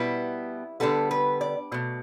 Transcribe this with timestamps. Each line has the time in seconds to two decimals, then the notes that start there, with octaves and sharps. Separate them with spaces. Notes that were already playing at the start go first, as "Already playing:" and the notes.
Already playing: B2 G3 B3 E4
0.80 D3 G3 B3 A4
1.11 B4
1.41 D5
1.72 B2 A3